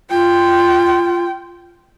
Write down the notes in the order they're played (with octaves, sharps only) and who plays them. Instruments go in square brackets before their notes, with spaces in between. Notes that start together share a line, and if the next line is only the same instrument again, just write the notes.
[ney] F4 [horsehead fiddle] G5